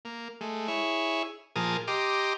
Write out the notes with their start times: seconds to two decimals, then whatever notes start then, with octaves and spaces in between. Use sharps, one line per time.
0.05 A#3
0.41 G#3 A3
0.68 E4 G#4 C#5
1.56 A#2 F3 G#4 A#4 A5 D#6
1.88 G4 D#5 A#5 C6 D6